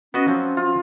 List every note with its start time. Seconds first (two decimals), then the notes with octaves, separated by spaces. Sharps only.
0.14 B3 C#4 F#4 D#5
0.28 F3 F#3 C4
0.57 F4